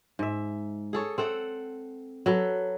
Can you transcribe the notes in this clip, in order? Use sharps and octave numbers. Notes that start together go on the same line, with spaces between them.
G#2 E5
G#4 A4 C#5
C4 A4 F#5
F#3 A4 B4